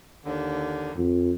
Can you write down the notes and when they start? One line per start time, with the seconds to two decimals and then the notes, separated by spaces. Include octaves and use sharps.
0.25 D#2 D3
0.97 F2